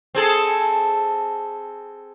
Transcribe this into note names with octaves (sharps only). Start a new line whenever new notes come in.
C4 G#4 A4